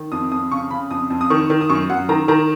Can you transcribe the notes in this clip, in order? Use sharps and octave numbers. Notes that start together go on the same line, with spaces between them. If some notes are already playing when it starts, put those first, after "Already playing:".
Already playing: D#3
F2 D#6
F2 D#6
C#3 C#6
C#3 B5
F2 D#6
F2
D#6
D#3 C#6
D#3
D#6
F#2 C#6
F#2 F#5
D#3 A#5
D#3 A#5